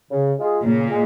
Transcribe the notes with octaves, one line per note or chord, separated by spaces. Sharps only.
C#3
G#3 F4 G#4
A#2 C#3
G#3 G#4